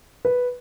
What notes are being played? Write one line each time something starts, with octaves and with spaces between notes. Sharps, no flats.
B4